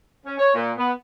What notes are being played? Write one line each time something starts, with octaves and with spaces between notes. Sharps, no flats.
C#4
C#5
A#2
B3